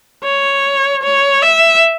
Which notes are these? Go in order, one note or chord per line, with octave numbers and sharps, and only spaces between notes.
C#5
C#5
E5